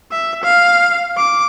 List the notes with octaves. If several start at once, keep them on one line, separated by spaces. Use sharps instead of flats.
E5
F5
D6